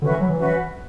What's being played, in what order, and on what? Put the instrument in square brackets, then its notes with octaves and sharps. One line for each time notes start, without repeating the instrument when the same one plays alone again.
[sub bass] D3 [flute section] C#4 F#4 B4 E5
[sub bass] E3
F#3
E3
[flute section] C#4 F#4 B4 E5